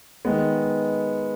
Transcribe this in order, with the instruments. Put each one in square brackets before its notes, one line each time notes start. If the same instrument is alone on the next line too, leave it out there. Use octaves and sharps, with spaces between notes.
[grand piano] D#3 G#3 B3